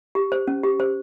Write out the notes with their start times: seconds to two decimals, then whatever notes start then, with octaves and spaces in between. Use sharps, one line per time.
0.15 G4
0.32 C5
0.48 C#4
0.64 G4
0.80 C5